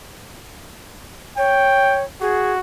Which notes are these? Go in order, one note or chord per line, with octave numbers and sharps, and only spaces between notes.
C#5 G5
F#4 G#4